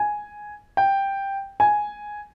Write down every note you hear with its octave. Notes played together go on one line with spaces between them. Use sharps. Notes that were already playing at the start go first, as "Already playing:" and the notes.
Already playing: G#5
G5
G#5